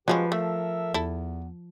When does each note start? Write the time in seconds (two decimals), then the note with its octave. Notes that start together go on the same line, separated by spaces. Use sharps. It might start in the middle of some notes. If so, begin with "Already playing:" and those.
0.08 F3 F#3 G#3 C#4 F4 G4 B4
0.32 A3 A4 A#4 E5
0.94 E2 E4 A4